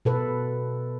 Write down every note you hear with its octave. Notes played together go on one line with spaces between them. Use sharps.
B2 A4 B4